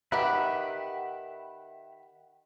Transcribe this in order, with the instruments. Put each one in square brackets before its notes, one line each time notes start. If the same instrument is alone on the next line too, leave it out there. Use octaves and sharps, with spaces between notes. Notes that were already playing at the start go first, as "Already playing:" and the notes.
[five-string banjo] D#3 G4 B4 [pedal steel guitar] E5 F#5 B5